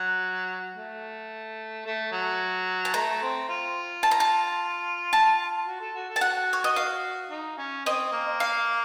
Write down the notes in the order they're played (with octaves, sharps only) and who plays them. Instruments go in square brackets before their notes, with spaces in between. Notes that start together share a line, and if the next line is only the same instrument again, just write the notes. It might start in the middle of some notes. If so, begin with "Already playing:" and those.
Already playing: [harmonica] F#3 [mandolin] F#5
[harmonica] A3
A3
F#3
[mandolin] A5
[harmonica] A3 [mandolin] A#5
[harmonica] C4
F4
[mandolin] A5
A#5
A5
A5
[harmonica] F#4
A4
F#4
A4
[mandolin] A5
[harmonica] F#4 [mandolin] F#5
[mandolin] C#5
D#5
F5
[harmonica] D#4
C#4
[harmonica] C4 [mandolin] D#5
[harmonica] A#3
[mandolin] F5